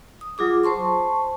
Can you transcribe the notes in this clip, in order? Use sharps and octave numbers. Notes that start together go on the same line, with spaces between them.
D#6
F#3 F4 G#4 D6
C5 A5 C6 C#6